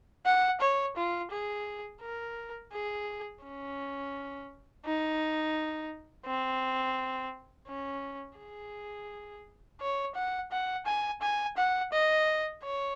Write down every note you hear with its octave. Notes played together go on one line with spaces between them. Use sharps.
F#5
C#5
F4
G#4
A#4
G#4
C#4
D#4
C4
C#4
G#4
C#5
F#5
F#5
G#5
G#5
F#5
D#5
C#5